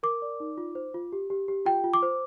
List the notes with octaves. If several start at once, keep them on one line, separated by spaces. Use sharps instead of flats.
A#4 D6
D5
D#4
F4
C5
F4
G4
G4
G4
F4 G5
F4
D6
C5